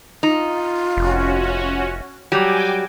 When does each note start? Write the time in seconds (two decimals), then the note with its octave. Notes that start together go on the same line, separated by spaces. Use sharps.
0.23 D#4 F4
0.97 F1 C#4 F#4
2.32 F#3 G3 G4 G5 G#5 D6